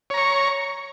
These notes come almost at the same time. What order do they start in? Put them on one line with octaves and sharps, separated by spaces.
C#5 A#5 C#6